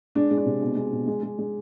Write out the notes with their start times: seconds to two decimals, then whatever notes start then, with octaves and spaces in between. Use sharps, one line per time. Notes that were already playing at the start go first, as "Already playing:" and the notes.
0.15 G#3 D4
0.31 G#3
0.38 D4
0.46 C3
0.62 B2
0.76 G#3
0.93 B2
1.08 G#3
1.23 G#3
1.39 G#3